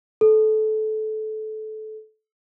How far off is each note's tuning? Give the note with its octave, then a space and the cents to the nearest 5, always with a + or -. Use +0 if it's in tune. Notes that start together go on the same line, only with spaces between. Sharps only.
A4 -20